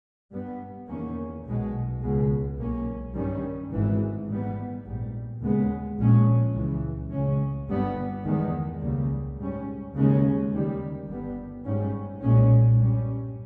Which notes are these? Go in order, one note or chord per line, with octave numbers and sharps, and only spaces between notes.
G2 G3 B3
E2 D#3 A#3 C#4
B1 B2 G#3
C#2 B2 G#3
B1 B2 A#3 C#4
G2 D#3 G3 C#4
G#1 G#2 E3
G#2 G3 B3
A#1 G#2 G3
D#2 C#3 G#3 B3
A#1 A#2 G#3 C#4
C#2 C#3 E3
C#2 C#3 G#3 C#4
G1 G2 G3 B3
E2 D#3 G#3 B3
C#2 C#3 G3 A#3
G#2 G3 C#4
D#2 C#3 G#3 C#4
D#2 D#3 G3
G1 G2 G3 B3
G#2 G3 C#4
B1 A#2 G#3 C#4
G2 G3 C#4